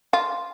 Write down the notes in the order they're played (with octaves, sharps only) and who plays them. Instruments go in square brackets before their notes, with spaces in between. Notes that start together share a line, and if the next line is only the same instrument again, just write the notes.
[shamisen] F4